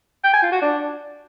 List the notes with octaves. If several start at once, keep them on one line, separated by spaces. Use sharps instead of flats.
G5
G#5
F4
F#4
D4